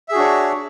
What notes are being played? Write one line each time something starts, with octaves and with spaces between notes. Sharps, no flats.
D4 F#4 G#4 C#5 E5